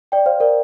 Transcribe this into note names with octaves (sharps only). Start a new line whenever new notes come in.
D5 G5
C5 F5
A#4 D5